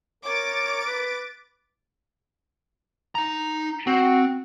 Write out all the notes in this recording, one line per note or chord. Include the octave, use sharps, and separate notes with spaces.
A#4 C#5 D6 A6
B4
D#4 A#5
C4 F#4